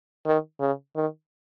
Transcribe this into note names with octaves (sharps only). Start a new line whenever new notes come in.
D#3
C#3
D#3